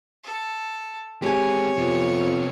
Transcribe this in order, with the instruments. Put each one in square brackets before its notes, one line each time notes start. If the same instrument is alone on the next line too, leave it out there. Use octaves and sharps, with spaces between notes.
[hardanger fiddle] A4
[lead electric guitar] G#3 C4 [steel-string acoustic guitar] G4 G#5 [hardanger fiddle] C#5
[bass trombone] F2 [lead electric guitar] C3 B3